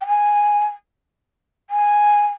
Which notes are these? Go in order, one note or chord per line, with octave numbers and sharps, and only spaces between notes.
G5
G#5
G#5